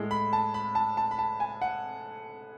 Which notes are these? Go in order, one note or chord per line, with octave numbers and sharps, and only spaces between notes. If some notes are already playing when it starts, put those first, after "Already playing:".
Already playing: A2 G#3
B5
A5
B5
A5
A5
B5
A5
G#5
F#5